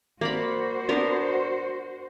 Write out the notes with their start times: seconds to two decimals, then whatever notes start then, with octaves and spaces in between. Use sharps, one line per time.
0.21 A#3 F#4 C5 D5 B5
0.89 B3 D4 A#4